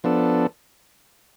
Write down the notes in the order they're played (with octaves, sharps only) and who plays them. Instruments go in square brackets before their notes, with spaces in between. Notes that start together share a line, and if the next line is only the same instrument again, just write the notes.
[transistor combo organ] F3 B3 D4 A4